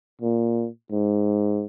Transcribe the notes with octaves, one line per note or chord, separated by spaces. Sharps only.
A#2
G#2